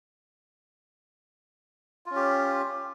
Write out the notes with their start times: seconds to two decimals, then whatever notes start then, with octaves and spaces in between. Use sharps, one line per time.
2.06 F4
2.11 C#4
2.16 G4